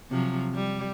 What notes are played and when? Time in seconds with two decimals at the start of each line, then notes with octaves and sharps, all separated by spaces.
0.10 C3 F3 F#3
0.55 G3